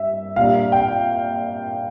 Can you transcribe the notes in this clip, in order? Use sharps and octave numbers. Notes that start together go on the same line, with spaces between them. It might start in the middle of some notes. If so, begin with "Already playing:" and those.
Already playing: G2 E5
A#2 G3 A#3 D4 F5
G5